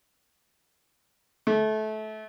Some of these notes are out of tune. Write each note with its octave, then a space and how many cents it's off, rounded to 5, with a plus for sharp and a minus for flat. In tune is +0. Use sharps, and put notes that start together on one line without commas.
A3 -25